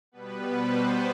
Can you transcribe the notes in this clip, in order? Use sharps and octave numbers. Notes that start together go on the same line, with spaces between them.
B2 G3 B3 B4
C5